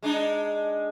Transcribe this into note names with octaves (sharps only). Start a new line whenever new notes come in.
G#3 D4 D#4